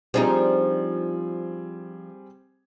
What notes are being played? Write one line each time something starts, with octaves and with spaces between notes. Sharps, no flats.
F3 G3 C4 D4 D#4 G#4